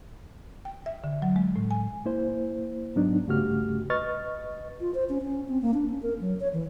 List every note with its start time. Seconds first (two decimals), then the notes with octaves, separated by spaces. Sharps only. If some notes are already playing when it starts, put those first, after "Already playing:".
0.65 G5
0.86 E5
1.04 D3
1.22 F#3
1.36 G#3
1.56 A2
1.71 G#5
2.06 A#3 E4 C5
2.96 G#2 F#3 B3 D4 D#4
3.28 G2 C#3 A3 F#4 G4 F6
3.90 B4 D#5 C#6 F6 A6
4.80 F4
4.94 C5
5.09 C#4
5.21 C#4
5.49 C4
5.62 A#3
5.74 D4
5.90 C#4
6.03 A#4
6.21 F#3
6.40 C#5
6.53 E3